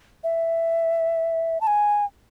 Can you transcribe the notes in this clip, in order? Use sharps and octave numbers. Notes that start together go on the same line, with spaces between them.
E5
A5
G#5